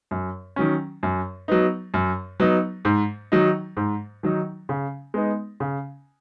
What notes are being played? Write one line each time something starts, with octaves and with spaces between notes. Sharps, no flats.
F#2
D#3 F#3 C#4
F#2
F#3 B3 D#4
F#2
F#3 B3 D#4
G#2
D#3 F#3 D#4
G#2
D#3 F#3 D#4
C#3
G#3 B3 D#4
C#3